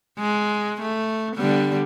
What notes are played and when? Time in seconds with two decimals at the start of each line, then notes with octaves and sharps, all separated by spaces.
0.19 G#3
0.82 A3
1.36 D3 G3 B3